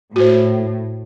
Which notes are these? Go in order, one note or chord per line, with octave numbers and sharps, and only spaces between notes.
A2 F#4 C5